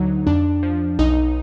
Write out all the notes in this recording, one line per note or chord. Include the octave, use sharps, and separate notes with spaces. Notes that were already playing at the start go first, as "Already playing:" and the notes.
Already playing: D2 D3 F#3 D#4
F2 D4
F3
B1 D#4